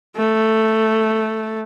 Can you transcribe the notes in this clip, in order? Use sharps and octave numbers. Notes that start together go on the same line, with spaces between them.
A3